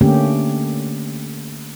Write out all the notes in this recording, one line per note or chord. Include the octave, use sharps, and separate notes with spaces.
D3 A3 A#3 C#4 G4